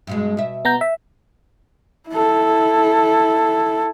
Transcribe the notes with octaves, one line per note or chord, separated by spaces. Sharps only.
G2 B2 G#3
B2 E5
B3 A#5 G6
E5
E4 A4